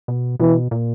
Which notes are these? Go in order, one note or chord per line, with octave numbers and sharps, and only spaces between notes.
B2
B2 E3
A#2